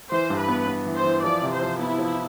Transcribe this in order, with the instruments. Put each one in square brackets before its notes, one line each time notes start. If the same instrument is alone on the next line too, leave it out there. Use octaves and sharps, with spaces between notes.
[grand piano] E3 [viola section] C5
[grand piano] G2
[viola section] B4
[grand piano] B3
B3
E3
[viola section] C5
[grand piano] E3
[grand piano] F3 [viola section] D5
[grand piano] C3
[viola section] C5
[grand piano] F3
[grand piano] B3 [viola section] E4
[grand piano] F3